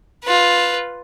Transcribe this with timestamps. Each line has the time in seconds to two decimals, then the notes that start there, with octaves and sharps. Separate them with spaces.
0.24 F4 B4